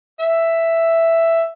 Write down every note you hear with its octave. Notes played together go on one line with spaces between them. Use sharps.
E5